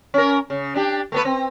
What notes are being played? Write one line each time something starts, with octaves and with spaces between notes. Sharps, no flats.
C#4 A#4
C#3
D4 G4
A3 B3 B4
C4